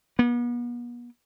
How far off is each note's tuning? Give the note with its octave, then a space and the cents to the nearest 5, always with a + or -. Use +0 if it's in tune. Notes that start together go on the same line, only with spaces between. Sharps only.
B3 -40